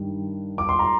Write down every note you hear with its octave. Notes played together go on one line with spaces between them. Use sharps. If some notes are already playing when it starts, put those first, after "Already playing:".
Already playing: G2 D#3 G3
D6
C6
A#5